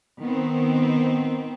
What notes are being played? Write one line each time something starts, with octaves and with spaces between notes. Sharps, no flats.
D#3 B3 C4